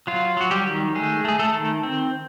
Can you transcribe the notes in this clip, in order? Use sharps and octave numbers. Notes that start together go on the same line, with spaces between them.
F#3 F4
F#3 F#4
G3 G4
D#3
G#3 A3 G#4
A3 G#4
A3 A4
D#3
C4